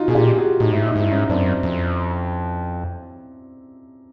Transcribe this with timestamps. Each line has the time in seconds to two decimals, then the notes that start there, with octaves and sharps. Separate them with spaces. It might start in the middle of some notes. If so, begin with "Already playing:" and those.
Already playing: D#4 F4 F#4
0.08 B2 G#4
0.15 A#2 F4 G4
0.37 F#4 G#4
0.60 A2 D#4
0.72 G#2 E4
0.81 A2
0.86 D#4
0.96 G#2
1.00 G2 E4
1.11 G#2 C#4 D#4
1.30 F#2 C4 D4
1.63 F2